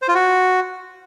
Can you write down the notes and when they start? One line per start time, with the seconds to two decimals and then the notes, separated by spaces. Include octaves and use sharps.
0.02 C5
0.08 F4
0.14 F#4